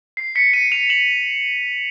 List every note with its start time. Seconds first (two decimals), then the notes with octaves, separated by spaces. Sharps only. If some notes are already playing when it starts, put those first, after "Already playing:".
0.17 C7
0.36 B6 C#7
0.54 C#7 D#7
0.72 D#7 F7
0.90 E7 F#7